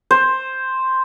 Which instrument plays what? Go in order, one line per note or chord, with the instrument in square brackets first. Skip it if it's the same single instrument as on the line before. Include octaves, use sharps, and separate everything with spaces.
[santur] C5